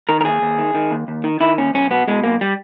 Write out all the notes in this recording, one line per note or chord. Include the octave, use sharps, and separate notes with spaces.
D#3 A#4
A#4
D#2 G#4
D#2
D#3
D#3
D#2
D#2
D#3
D#3 E4
D#2 C#4
B1 C#4
B2 B3
B2 G#3
B1 A#3
G3